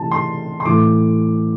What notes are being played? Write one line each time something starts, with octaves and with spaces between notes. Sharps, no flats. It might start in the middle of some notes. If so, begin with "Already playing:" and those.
Already playing: C3 E3 A3 C4 E4 A5
C6
C6
A2 E3 A3 E4 D6